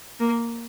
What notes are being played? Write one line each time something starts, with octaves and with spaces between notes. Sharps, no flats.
A#3